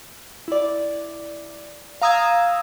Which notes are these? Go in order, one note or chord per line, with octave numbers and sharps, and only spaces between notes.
E4 D5
F5 A#5 D#6 E6 G#6